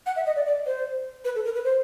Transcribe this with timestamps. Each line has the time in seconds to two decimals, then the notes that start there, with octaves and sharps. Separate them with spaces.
0.06 F#5
0.16 E5
0.26 D#5
0.36 D5
0.46 D5
0.66 C5
1.25 B4
1.35 A4
1.45 A#4
1.55 B4
1.64 C5